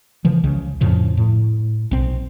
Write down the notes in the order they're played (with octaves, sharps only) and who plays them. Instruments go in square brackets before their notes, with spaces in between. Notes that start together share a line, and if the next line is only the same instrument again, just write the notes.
[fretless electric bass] C#3 E3 F3
C#2 C#3
F2 A2 C#3 F3
A2
B1 C4